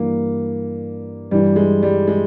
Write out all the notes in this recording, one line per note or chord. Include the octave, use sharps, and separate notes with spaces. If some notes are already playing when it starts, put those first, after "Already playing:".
Already playing: G2 E3 A#3
G2 E3 G3
G#3
G3
G#3